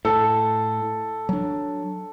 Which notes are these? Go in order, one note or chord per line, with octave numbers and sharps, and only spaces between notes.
A2 A4
F#3 D4